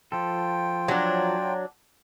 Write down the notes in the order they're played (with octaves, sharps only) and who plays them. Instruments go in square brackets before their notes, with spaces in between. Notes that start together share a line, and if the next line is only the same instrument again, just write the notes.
[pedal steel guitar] F3 A4 [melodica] F4 G5
[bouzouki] F#3 D4